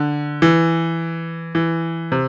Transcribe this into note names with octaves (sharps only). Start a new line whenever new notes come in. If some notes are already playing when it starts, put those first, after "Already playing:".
Already playing: D3
E3
E3
C3